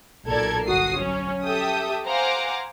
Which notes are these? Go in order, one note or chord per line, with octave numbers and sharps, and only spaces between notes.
B1 A#2 A4 A#4 D5 G#6
G1 F#4 D#6 C7
F#3 C#4
G4 A4 E5 G5 D#6
C5 F5 F#5 G#5 A#5 D6